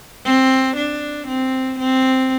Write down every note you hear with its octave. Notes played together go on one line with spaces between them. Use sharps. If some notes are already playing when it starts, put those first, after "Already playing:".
C4
D4
C4
C4